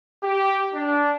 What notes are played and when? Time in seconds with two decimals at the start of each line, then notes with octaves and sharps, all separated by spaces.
0.23 G4
0.74 D4